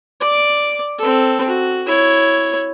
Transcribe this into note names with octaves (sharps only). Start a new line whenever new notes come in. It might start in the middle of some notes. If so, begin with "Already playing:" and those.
D5 D6
C4 A4
F#4
E4 C#5